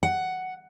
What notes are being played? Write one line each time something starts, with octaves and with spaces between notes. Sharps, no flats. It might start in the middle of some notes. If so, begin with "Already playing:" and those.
F#5